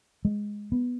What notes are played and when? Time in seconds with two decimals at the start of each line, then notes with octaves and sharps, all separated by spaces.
0.25 G#3
0.72 B3